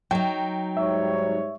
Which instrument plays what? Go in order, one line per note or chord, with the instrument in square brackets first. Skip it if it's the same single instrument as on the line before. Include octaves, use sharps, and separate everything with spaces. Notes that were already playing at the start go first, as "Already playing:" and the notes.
[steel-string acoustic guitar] F#3 D#4 [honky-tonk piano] G5
[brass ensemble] G#2 G3 C#5 [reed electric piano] E5